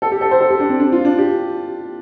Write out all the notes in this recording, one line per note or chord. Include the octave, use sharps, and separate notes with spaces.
A4
G4
A4
C5
A4
G4
D4
C4
D4
F4
D4
G4